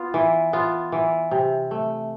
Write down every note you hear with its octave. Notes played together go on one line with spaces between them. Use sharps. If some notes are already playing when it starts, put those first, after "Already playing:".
Already playing: B3 F4
E3
B3 F4
E3
C3
A3